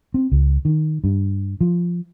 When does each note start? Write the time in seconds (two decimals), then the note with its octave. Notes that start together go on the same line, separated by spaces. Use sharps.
0.14 C4
0.32 C#2
0.65 D#3
1.04 G2
1.61 F3